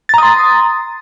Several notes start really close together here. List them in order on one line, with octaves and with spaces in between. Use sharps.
A6 A#5 D#6 C6